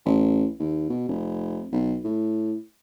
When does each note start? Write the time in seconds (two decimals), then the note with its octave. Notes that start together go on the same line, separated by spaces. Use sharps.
0.05 A1
0.60 D#2
0.90 B2
1.09 F1
1.72 B1
2.04 A2